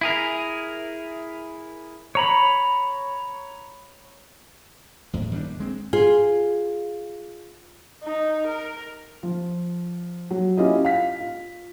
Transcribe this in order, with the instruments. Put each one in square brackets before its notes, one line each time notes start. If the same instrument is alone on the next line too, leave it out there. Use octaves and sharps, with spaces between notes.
[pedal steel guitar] E4 G#4 A#4
C#5 A#5 B5
[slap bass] E2 A2
D#2 G3 C4 D4
G#3 C4
[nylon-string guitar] F4 G#4
[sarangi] D#4
A#4
[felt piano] F3
F#3
C#4 E4 F4 G4 D#5
F5 B6
F4